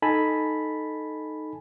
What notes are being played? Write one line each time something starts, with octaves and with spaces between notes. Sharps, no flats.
D#4 A4 G#5 A5 B5